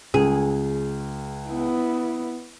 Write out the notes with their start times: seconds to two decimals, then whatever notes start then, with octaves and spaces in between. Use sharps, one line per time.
0.14 C#2 G#4
1.47 B3 E4